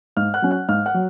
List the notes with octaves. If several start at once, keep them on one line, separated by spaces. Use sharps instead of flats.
G#2 F5 F6
F#5 F#6
F#3 C#4
F#5 F#6
G#2 F5 F6
F#5 F#6
F#3